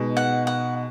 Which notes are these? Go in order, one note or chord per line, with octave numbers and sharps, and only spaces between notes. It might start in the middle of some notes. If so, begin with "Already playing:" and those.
Already playing: B2 G#3 D#4
F#5
F#5